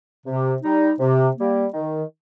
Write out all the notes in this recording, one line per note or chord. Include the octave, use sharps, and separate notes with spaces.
C3
G3 D#4
C3
G3 A#3
D#3